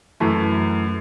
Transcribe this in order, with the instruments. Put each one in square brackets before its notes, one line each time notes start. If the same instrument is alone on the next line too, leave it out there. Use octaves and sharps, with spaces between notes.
[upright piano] F#2 E3 A3